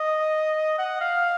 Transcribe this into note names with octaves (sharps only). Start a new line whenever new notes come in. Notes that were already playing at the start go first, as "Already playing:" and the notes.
Already playing: D#5
F#5
F5